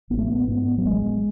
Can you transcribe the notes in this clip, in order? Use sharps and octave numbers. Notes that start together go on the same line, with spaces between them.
A1 B3
A3
B3
G#2 B3
F#3
A1 G#3